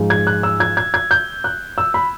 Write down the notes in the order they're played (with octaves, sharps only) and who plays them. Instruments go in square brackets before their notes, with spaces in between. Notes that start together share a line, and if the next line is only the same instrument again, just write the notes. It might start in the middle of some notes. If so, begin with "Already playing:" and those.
Already playing: [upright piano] G#2 F3 G#3
G#6
F#6
E6
G#6
G#6
G#6
G6
F#6
E6
B5